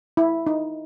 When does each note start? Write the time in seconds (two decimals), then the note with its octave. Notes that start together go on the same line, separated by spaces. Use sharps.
0.17 E4
0.47 D#4